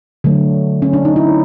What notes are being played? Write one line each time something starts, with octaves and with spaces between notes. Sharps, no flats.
D3 F#3 A3
C#4
D4
D#4
E4